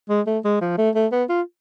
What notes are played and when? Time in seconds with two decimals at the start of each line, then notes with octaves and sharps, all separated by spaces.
0.09 G#3
0.27 A3
0.44 G#3
0.61 F3
0.78 A3
0.95 A3
1.12 B3
1.29 F4